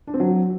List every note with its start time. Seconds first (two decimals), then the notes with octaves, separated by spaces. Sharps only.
0.07 D4
0.14 C4
0.20 F#3